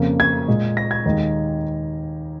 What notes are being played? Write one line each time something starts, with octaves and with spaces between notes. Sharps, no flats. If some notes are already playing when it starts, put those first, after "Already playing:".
Already playing: F2 C#3 A#3
G#6
A#2 G#3
A#6
G#6
D#2 D#3 G#3